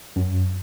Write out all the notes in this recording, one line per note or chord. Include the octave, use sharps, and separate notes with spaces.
F#2